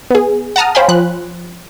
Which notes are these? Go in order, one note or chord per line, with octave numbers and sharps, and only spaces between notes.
B3 G#4
F#5 A5 A#5 D#6 F6
C5 C#5 F5 G5 G#5 B5
F3 F#6